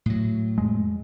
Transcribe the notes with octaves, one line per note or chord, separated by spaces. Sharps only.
A2 F#3
F2 G#3